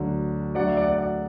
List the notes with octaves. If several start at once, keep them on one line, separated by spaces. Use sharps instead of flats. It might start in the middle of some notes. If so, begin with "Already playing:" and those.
Already playing: D2 D3 F#3
D2 D3 F#3 D5 F#5
E5
D5 F#5
D5 F#5
D5 F#5